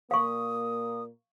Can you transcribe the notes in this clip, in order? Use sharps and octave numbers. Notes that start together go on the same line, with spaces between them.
A#2 A#3 F5 C#6 D#6